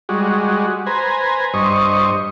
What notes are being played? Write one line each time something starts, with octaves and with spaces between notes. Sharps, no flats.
G3 G#3 F#4
B4 C5 G#5 A#5
G2 C5 D#5 C#6